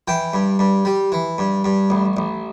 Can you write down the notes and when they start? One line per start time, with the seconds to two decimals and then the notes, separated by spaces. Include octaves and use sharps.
0.08 E3 G5
0.34 G2
0.59 G2
0.85 G3
1.12 E3
1.38 G2
1.65 G2
1.90 A1
2.17 A1